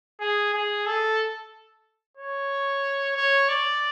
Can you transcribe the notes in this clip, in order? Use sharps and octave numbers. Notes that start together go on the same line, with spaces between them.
G#4
G#4
A4
C#5
C#5
D5